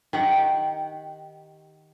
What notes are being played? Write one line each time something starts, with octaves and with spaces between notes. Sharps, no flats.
D#3 G4 F#5